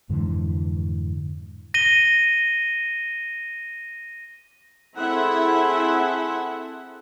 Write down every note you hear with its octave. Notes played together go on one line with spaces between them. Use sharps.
F2 G#2 D3 E3
A#6 D#7 G7
C4 E4 G#4 A4 E5 F#5